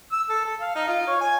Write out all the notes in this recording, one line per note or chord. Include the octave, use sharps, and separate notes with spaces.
E6
A4
A4
F5
D#4
F4
C#5
G#5